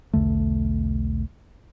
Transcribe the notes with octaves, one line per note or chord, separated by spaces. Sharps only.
B1 E2 D3 A3